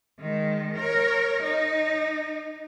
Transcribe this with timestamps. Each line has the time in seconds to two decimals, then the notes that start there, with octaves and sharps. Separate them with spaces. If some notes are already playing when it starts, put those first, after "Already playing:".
0.19 D#3 G#3
0.77 A#4 C#5
1.43 D#4